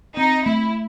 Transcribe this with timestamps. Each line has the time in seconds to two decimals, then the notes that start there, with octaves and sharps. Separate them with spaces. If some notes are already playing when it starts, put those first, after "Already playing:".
0.17 C4 D#4
0.45 A3 E4